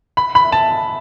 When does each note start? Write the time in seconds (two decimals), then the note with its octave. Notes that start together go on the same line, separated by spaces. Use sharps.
0.17 B5
0.35 B5
0.52 A5